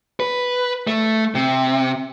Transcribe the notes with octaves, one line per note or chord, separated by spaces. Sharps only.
B4
A3
C3